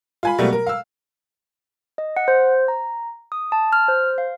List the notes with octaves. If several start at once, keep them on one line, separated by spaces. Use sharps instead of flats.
F4 G#5 B5
B2 F#3 G3 A3 A#3
A#4
F5 E6
D#5
F#5
C5
A#5
D#6
A5
F6
C5
F5